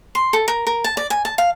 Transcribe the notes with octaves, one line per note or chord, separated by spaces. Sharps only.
C6
A4
A#4
A#4
A5
D5
G#5
A5
F5